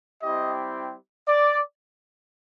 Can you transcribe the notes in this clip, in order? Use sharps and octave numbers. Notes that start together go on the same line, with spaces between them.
G3 C4 E4 G4 D#5
D5